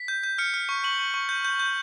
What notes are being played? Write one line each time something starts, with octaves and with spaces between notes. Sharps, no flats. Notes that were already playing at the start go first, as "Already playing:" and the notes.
Already playing: B6
G6
G6
F6 C#7
F6
C#6
C#6 F#7
C#6
C#6
G6
G6
G6